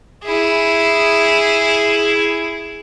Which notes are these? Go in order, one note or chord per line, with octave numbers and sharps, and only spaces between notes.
E4 G#4